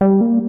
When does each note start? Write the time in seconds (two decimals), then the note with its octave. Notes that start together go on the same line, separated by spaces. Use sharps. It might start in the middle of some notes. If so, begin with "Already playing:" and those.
0.01 G3
0.21 A#3